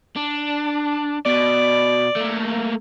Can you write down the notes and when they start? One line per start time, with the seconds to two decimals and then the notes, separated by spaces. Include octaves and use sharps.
0.16 D4
1.26 B2 D5
2.16 A3 A#3